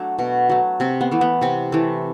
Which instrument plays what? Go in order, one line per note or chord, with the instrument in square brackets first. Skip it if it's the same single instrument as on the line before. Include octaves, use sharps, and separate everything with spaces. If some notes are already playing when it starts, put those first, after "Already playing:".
Already playing: [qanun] F#3 A3 D4
B2
F#3 A3
C3 C4
B3
E3 A3
B3
C3 C4
E3 A3